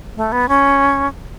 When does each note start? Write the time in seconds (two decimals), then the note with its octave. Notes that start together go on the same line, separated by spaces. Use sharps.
0.17 A3
0.32 B3
0.48 C#4